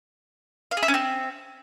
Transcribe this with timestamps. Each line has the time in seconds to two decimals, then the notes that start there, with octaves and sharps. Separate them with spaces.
0.71 F5
0.77 G#4
0.83 E5
0.88 C#4
0.94 C4